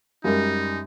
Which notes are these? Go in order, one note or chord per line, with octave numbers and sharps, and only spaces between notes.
F#2 G3 G#3 D#4 G4 A#4